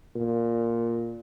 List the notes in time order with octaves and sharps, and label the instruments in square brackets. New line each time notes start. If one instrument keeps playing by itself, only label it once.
[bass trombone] A#2